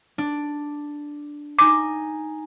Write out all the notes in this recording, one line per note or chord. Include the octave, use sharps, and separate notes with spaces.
D4
D#4 G#5 D6